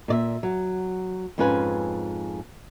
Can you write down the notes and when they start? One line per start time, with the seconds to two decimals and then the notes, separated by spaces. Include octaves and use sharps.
0.08 A#2 D5 E5
0.43 F#3
1.38 F2 G#2 C#4 F4 B4 G#5